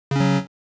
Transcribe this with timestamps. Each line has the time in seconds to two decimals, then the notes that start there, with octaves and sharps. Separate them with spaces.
0.11 C#3
0.16 C#4
0.20 F#3